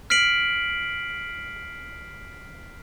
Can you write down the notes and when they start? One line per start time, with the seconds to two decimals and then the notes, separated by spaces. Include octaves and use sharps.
0.10 F6 B6 C7 D7 F#7